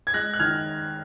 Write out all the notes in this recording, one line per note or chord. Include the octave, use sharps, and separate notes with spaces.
G#6
G#3 F#6 A#6
F#6
D#3 F6 G#6